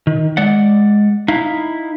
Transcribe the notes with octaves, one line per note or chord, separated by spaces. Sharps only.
D#3
G#3 D5 F#5
D#4 E4 F5